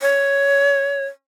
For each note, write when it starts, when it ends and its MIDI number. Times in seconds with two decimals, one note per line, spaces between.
0.01 1.05 73